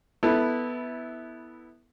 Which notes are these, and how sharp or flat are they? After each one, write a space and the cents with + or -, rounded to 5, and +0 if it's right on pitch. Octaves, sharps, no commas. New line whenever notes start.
B3 +0 E4 -15 A4 +5